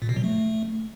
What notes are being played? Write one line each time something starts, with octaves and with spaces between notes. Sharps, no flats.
A#2
B2
F#3
A3